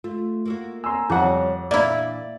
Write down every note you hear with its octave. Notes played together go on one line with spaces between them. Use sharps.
A3 F4
A#3 E4 F#4
G#5 A#5 C6 E6
F2 C#3 F#3 G3 F#5 D6
A#2 E3 A#3 D4 E4 D5 E5